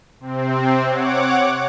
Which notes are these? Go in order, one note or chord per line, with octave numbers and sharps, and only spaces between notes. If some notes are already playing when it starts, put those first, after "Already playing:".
C3 C4
C#5 F#5 D6